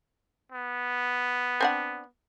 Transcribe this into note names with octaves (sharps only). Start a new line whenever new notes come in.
B3
C4 D4 F#5